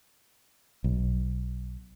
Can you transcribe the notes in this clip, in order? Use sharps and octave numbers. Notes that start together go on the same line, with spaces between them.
B1